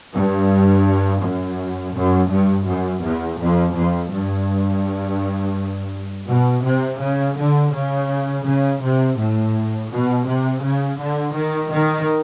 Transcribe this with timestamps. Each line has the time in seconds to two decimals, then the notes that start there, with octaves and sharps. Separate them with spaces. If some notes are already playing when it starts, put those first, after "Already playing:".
0.14 G2
1.22 F#2
1.95 F#2
2.31 G2
2.68 F#2
3.03 E2
3.40 F2
3.76 F2
4.12 G2
6.28 B2
6.64 C3
7.01 C#3
7.37 D3
7.73 C#3
8.45 C#3
8.82 C3
9.18 A2
9.91 B2
10.26 C3
10.62 C#3
10.99 D3
11.34 D#3
11.71 D#3